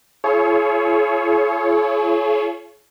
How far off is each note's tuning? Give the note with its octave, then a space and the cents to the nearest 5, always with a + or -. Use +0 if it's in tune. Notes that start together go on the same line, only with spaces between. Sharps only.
F4 -40 G#4 +40 C#5 +0